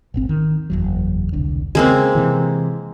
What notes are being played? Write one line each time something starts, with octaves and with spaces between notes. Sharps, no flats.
D#1 G#1 C4
D#3
F#1 E2 F#3
E1 C2 D3
C#3 G#3 A#3 C4
C3 E3